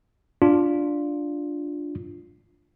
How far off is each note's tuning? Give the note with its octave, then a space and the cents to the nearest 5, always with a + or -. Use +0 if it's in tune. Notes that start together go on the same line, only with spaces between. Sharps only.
D4 +0 F4 +5